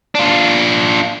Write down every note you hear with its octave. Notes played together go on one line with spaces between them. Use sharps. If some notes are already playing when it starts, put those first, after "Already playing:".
D4 F4